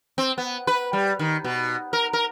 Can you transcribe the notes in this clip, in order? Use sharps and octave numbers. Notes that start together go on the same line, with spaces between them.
C4
B3
B4
G3
D#3
B2
A#4
A#4